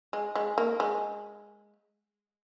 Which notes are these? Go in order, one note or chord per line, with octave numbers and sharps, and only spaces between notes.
G#3
G#3
A#3
G#3